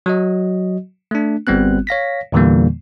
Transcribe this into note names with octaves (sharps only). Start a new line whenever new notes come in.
F#3 F#4 D#5
A3 D4
G1 G3 B3 C4 F#6
C#5 F5 A#6 B6
E2 A#2 D3 E3 G3 A#3